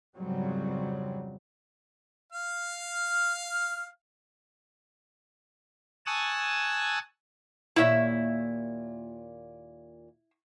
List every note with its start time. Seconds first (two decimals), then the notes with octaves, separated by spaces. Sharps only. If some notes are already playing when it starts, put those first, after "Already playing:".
0.16 F2 G#2 C#3 F#3 G3 C4
2.33 F5 F6
6.06 G#5 A5 C#6 D#6 E6 F#6
7.76 D#2 A#2 E4 C#5 E5